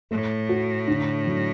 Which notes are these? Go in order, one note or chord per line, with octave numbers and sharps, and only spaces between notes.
A2 A3
F#4
D3
F#3